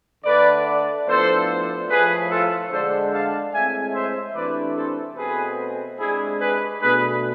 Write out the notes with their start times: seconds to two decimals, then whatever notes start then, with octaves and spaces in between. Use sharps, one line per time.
0.24 D3 A3 D4 B4 D5
1.06 A2 F3 B3 D4 A4 C5
1.88 A2 F3 A3 G#4 B4
2.29 F4 A4
2.70 D3 G#3 D4 A4 C5
3.11 F5 A5
3.52 A2 G#3 C4 E5 G#5
3.92 C5 E5
4.33 C3 E3 A3 D4 B4 D5
4.75 A4 C5
5.15 B2 A3 C4 G#4 B4
5.97 C3 G#3 D4 E4 G#4
6.39 G#4 B4
6.80 B2 A3 D4 G#4 B4